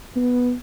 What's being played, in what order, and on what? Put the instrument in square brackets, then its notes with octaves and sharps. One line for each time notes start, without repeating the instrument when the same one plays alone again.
[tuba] B3